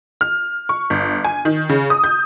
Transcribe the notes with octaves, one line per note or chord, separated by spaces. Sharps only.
F6
C#6
G1
G#5
D#3
C#3
D#6
G6